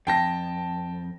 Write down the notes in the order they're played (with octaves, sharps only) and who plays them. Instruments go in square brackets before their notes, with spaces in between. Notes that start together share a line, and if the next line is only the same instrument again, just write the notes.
[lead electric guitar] F2 [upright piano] G5 A5 A#6